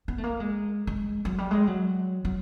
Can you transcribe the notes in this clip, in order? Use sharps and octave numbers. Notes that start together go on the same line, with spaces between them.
B3
A3
A#3
G#3
G#3
F#3
G3
G#3
F#3
F#3